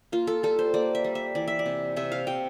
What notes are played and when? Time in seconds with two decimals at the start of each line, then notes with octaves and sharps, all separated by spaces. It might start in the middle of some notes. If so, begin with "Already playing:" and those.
0.12 A#3 F4
0.27 A4
0.43 G3 A4
0.59 C5
0.74 A#3 D5
0.95 E5
1.04 G3
1.15 E5
1.35 E3 D5
1.48 E5
1.59 D5
1.66 C3
1.96 C3 E5
2.12 F5
2.27 C3 G5